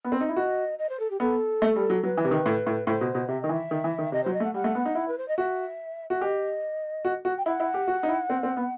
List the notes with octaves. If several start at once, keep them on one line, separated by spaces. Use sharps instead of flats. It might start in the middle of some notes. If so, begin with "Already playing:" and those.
B3
C4
D#4
E4
F#4 D#5
D#5
C5
A4
G4
B3 A4
A3
G3
F#3
F#3 B4
E3
C3
D#3
A2
A2
A2 C5
B2
B2
C3 E5
D#3 D#5
E3
E5
D#3
E3
D#3
C3 D#5
F#3 C5
D#5
A3
F#5
G3 F#5
A3
B3
D#4
E4
B4
C5
D#5
F#4 E5
F#4 E5
G4 D#5
F#4
F#4
G5
E4 F#5
E4
G4
F#4
D#4
E4
C4
C4
B3